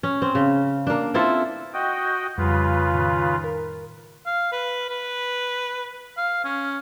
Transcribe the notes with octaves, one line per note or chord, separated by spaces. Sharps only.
C#4
C4
C#3
A#3 D4
C4 E4 F4 A4
F#4 D#5 G5
F2 C#3 G3 F4 B4
A2 D#3
A#4
F5
B4
B4
F5
C#4